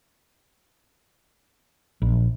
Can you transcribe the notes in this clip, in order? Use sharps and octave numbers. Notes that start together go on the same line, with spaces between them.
A#1